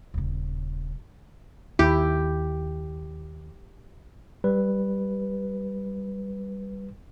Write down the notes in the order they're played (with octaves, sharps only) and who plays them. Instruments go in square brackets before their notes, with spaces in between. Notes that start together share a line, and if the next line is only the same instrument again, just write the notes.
[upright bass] D#1 C#3
[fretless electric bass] D#2 [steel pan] E4 [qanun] G4
[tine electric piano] G3 B4